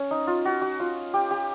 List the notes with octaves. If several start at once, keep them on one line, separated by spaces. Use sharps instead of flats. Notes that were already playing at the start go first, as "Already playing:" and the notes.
Already playing: C#4
D#4
F4
F#4
F#4
F4
G4
G4